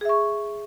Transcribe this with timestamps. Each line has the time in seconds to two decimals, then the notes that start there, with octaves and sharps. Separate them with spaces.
0.01 G#4
0.05 E5
0.09 C#6